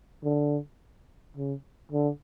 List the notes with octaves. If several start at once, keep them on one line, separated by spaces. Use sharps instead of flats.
D3
C#3
D3